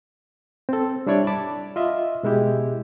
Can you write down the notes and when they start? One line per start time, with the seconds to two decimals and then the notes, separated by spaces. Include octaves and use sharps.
0.69 C4 A4
1.07 G3 D4 E4 C#5 D5 G#6
1.27 A5 B5 D6
1.76 F4 D#5 E5
2.23 B2 G#3 E4 G4